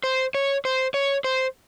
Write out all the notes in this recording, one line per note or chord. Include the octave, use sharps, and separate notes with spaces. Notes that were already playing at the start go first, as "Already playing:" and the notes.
C5
C#5
C5
C#5
C5